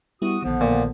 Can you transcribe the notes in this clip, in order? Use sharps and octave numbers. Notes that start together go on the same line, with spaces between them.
G3 B3 E4 F#4 D#6
A#1 D3 D#3 F3 B3
A#2